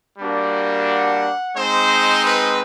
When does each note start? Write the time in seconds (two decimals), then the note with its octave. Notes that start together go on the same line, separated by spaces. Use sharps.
0.18 G3 A#3 D4 F#4
0.86 F#5
1.55 G#3 C4 D#4 C5
2.24 B4